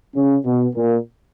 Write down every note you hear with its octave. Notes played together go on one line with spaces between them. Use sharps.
C#3 C#4
B2 B3
A#2 A#3